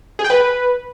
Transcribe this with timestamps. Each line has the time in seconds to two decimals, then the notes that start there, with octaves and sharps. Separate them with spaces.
0.19 G#4
0.24 G5
0.30 B4